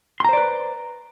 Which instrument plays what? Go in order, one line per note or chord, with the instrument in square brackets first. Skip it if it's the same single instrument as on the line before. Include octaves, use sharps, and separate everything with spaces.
[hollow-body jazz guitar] C6
A#5
C5
D5
B4